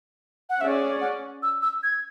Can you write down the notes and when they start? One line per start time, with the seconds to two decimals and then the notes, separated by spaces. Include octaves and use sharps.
0.49 F#5
0.60 C#4 G#4 D5 E5
1.01 F#5
1.43 E6
1.62 E6
1.83 G#6